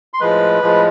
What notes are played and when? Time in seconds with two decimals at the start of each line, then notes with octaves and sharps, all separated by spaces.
0.14 C6
0.20 A2 F3 G#3 B4 B5
0.62 A2 F3 G#3